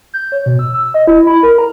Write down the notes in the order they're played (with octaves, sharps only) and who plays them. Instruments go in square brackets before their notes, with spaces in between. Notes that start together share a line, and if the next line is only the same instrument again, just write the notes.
[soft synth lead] G6
C#5
B2
E6
E6
D#5
E4
B5
A#4
A#5